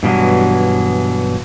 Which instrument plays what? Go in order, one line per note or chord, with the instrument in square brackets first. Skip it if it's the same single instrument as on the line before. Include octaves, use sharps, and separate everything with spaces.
[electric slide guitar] G2 B2 E3 F#3